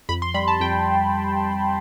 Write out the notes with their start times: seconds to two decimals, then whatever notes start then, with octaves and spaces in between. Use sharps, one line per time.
0.09 F2 B5
0.22 C6
0.34 G3 B5
0.48 A5
0.60 F2 G5